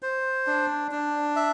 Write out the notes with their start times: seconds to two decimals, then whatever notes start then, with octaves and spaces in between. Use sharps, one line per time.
0.02 C5
0.47 D4
0.91 D4
1.36 E5